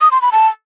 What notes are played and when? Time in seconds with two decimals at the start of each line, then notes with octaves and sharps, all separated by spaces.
0.01 D#6
0.12 C6
0.22 B5
0.32 A5